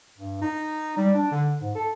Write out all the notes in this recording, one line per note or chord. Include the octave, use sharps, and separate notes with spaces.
G2
D#4
G3
D4
D3
G#2
A4